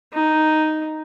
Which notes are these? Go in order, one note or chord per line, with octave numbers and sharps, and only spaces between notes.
D#4